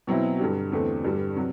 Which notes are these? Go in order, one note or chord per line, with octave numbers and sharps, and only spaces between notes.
B2 F#3 C4 E4
G2 D3 G3
E2 D3 A3 C4
G2 D3 G3
C3 F#3